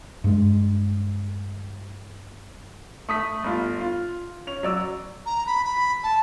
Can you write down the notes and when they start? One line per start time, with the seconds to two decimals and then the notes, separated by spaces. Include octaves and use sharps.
0.24 G2 G#3
3.09 A3 D#6 B6
3.44 G1 F4
3.80 F4
4.47 C#4 F7
4.63 F#3 D5 E6
5.26 A#5
5.47 B5
5.65 B5
6.04 A5